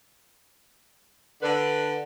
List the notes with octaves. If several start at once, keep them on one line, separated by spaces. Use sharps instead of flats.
D3 B4